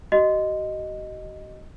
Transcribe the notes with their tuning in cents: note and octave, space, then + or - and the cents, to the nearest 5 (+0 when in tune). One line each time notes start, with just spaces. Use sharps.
F#4 +45 D#5 -5